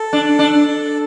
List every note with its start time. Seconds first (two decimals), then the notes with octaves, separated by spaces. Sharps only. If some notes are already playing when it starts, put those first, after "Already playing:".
Already playing: A4
0.13 D4
0.39 D4